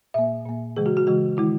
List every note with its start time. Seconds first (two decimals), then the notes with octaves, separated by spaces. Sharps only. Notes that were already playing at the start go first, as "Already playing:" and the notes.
0.14 A#2 A#3 E5
0.46 A#2 A#3
0.76 C#3 E3 G#3 G#4
0.86 F#4
0.97 F#4
1.07 C#3 E3 G#3 F#4
1.37 D#3 G#3 E4